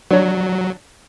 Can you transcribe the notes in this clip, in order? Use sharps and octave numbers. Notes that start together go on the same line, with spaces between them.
F#3 D4 C#5